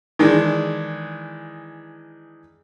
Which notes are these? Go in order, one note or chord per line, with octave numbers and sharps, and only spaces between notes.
D#3 E3 G#3 D4